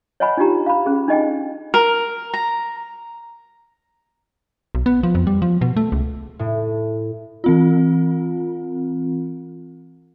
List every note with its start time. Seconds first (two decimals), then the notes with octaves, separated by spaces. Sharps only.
0.20 C#5 D#5 F#5 G#5 B5
0.37 D4 D#4 F4 G4 A#5
0.66 F5 B5
0.86 C#4 G#4
1.08 D4 D#4 D#5 G5 G#5
1.74 A#4
2.34 A#5
4.75 B1
4.86 B3
5.03 F3
5.15 F2
5.27 G3
5.42 F3
5.61 B2
5.77 A3
5.92 C#2
6.39 A2
7.44 E3 C4 F4